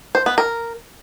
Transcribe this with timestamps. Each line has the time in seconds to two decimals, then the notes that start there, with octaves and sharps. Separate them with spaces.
0.15 C5
0.26 B3
0.38 A#4